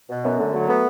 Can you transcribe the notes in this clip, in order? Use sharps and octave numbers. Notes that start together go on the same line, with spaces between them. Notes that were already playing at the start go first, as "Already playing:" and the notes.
B2
F#2 B3
D3 A3
F#3 A3
A3 B3